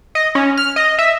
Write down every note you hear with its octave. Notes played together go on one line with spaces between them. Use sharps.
D#5
C#4
F6
D#5
E5